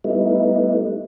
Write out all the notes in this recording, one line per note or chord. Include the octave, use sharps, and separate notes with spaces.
G3 A3 B3 D#4 E4